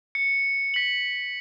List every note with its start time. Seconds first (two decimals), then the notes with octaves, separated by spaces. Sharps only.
0.15 C#7
0.74 B6 F#7